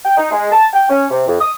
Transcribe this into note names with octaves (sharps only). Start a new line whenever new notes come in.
G5
D#4
G#3
A5
G5
C#4
C3
F2
D#6